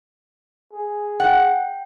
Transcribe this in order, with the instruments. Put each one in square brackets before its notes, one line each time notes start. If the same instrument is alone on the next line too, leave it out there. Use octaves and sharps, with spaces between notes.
[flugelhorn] G#4
[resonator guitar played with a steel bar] F#5 [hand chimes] G5